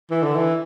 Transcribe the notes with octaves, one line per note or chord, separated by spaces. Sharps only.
E3
D3
E3